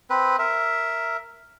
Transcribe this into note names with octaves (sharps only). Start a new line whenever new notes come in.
C4 B4
A#4 E5